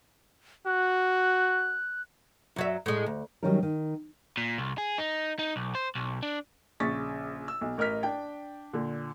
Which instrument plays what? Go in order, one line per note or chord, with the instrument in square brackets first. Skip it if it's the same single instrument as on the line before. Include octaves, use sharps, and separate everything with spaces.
[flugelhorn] F#4 [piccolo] F#6
[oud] F#2 F#3 E5
A2 G#3
D2
[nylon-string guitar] D#3 F#3 G3 C#4 D#4 A#4
D#3
[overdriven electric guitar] A#2
C2
G#4
D#4
D#4
B1
C5
B1
D4
[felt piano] A#1 C#3 C#6 A6 B6
E6
B1
A1 A#4 D#5 F6 B6
D4 G5
A#2 D3